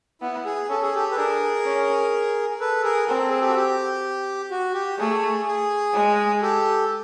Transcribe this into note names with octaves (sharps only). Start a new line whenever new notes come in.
B3 E4
G#4
C#4 A4
G#4
G4 A4
B4
D4 G#4 A#4
C#4
A4 B4
G#4 A#4
C4 A#4
A4
G#4
G4 A4
F#4
G4
F#4
G4
A3 G#4
G#4
G#3
G4 A4